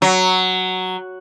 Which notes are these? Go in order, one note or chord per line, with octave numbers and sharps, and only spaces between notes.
F#3